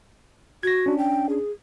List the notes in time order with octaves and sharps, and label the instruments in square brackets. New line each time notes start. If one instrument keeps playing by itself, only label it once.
[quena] F#4 [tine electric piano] G#6 A#6
[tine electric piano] C#4 D4
[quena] G5
G#4